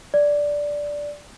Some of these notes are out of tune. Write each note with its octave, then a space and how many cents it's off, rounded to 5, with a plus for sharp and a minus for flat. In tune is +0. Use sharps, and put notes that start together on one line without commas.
D5 -5